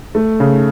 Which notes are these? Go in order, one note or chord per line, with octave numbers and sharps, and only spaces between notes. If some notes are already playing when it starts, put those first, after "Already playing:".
A3
C#3